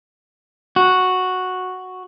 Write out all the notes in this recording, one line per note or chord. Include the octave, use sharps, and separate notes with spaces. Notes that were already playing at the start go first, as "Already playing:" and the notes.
F#4